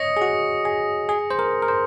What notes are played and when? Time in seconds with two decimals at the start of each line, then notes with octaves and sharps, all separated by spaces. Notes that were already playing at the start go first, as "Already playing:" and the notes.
Already playing: C#5 D#5 D#6 A#6 C#7
0.17 G#4
0.22 F#4
0.65 G#4
1.09 G#4
1.31 C5
1.39 A#4
1.62 A#4
1.68 C5